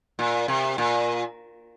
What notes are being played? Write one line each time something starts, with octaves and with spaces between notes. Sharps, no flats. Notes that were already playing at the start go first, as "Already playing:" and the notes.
A#2
C3
A#2